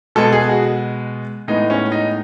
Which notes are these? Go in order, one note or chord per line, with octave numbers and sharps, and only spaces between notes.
B2 G#3 B3 A4
G#4
F#4
A2 G#3 B3 D#4
C#4
D#4